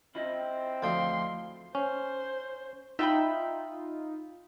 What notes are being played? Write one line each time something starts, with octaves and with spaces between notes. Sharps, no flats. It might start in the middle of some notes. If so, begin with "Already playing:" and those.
C4 E4 F4 D#5
D2 F3 G5 C6
C#4 C5
D#4 F4 E5 G5 B5